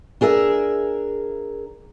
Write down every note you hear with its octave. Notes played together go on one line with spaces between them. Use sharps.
D4 G#4 A#4 E5